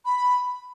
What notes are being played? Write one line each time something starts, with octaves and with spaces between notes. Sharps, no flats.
B5